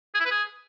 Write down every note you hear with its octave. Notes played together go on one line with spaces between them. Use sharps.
G#4
E4
B4
G#4